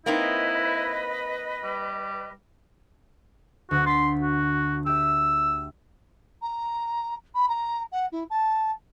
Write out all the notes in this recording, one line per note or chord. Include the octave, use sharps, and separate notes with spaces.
A#3 C4 D#4 E4 B4 D#5
G3
D2 F#4
C6 A6 B6
F#4
G4 E5 E6
A#5
B5
A#5
F#5
E4
A5